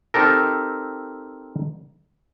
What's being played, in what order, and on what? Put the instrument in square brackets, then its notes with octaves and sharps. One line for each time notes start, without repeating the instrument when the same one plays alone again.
[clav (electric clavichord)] C4 D#4 G4 A4 A#4